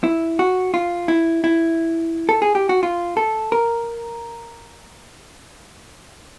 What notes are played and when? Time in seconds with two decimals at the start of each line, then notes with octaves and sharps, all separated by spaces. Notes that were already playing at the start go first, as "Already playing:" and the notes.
0.04 E4
0.39 F#4
0.74 F4
1.08 E4
1.44 E4
2.29 A4
2.42 G#4
2.55 G4
2.69 F#4
2.83 F4
3.17 A4
3.52 A#4